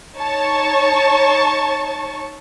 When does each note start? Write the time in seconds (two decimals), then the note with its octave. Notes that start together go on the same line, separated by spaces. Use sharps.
0.15 D#4 C#5 A5 C#6